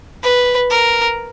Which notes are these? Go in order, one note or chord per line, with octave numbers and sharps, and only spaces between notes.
B4
A#4